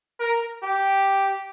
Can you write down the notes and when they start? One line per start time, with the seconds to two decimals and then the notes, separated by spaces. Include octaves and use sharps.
0.20 A#4
0.63 G4